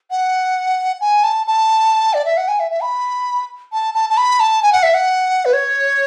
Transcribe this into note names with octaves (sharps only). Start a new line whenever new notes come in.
F#5
G#5
A5
A5
D5
E5
F#5
G#5
E5
E5
B5
A5
A5
A5
B5
A5
G#5
F#5
E5
F#5
B4
C#5